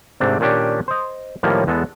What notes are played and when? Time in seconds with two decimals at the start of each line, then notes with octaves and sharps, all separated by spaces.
0.20 G#2 C3 A3 C4 D4
0.40 A#2 D#3 C#4 D4 G4
0.88 C5 D#5
1.43 A2 D#3 F3 G3 A#3 C#4
1.67 E2 G#3 B3 A4